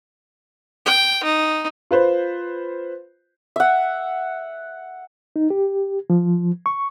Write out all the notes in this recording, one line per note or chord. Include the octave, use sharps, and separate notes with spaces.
G5
D#4
F4 B4 C5
E5 F#5
D#4
G4
F3
C#6